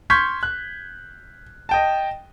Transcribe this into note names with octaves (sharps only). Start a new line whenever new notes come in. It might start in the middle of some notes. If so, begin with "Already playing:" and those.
C6 C#6 F6 G6 G#6 B6
F#6
D#5 G5 A5